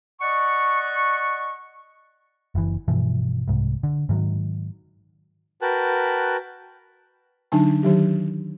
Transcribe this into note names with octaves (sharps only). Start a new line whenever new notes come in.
D5 D#5 F#5 C#6
F#1 E3
G2 B2 E3 F3
C2 G#2
D3
G#2 D#3 F#3
F#4 A#4 B4 G5 A5 F#6
D3 F#3 D4 D#4 G#5 A5
D#3 F#3 G4